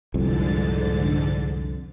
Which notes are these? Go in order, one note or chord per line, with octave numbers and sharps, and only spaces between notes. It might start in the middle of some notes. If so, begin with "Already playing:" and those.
C2 F2 G#2 D3 A6